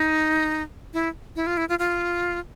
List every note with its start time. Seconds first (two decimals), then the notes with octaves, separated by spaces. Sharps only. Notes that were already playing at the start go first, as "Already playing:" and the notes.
Already playing: D#4
0.94 E4
1.36 E4
1.47 F4
1.57 E4
1.69 F4
1.79 F4